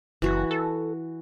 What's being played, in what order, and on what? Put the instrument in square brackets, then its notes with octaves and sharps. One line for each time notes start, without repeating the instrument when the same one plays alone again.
[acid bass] F#1 [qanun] E3 F#4
[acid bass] A4